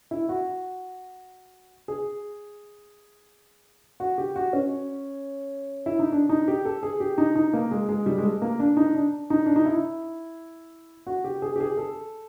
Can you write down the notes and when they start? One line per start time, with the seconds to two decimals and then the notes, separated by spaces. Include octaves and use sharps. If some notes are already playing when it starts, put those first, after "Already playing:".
0.11 E4
0.29 F#4
1.88 G#4
4.00 F#4
4.18 G4
4.36 F#4
4.53 C#4
5.86 E4
5.99 D#4
6.12 D4
6.29 D#4
6.48 G4
6.65 A4
6.83 G#4
7.00 G4
7.18 D#4
7.36 D#4
7.53 A#3
7.71 G#3
7.89 G#3
8.06 G3
8.18 G#3
8.24 A3
8.42 A#3
8.59 D4
8.77 D#4
8.94 D4
9.30 D#4
9.46 D4
9.56 D#4
9.65 E4
11.07 F#4
11.24 G4
11.42 G#4
11.56 G4
11.60 G#4
11.77 A4